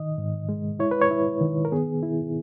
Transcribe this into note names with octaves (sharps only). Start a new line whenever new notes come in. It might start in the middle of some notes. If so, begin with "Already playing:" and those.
Already playing: D#3 D#5
G#2
G#3
E4 C#5
B4
C#5
E4
D#3
A#4
B3 G#4
E4